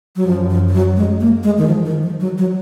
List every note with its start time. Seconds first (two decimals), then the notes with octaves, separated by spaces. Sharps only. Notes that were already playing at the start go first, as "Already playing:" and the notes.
0.16 F#3
0.26 F#2 F3
0.50 F3
0.68 F3
0.73 F#3
0.97 G#3
1.21 A#3
1.43 G#3
1.58 D#3
1.67 F3
1.86 D#3
2.03 F3
2.20 F#3
2.38 F#3